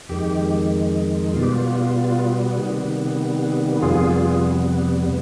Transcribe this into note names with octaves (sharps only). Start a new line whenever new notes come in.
F2 D#3 G#3 G4
B2 G3 B3 F4
G4
F4
C3 D#3 G3 B3
F2 C3 G3 B3 F4 G#4
C3